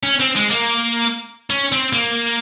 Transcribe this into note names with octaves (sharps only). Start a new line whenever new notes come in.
C#4
C4
G#3
A#3
C#4
C4
A#3